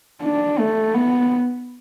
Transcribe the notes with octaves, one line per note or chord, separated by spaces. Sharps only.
D4
A3
B3